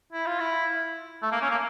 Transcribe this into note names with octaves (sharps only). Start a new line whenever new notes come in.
E4
F4
E4
A3
A#3
C#4
A#3